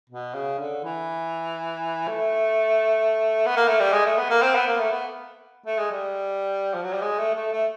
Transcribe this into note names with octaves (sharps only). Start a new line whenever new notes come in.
B2
C#3
D3
E3
A3
B3
A#3
A3
G3
G#3
A3
B3
A#3
C4
B3
A#3
A3
B3
A3
G#3
G3
F3
F#3
G3
G#3
A3
A3
A3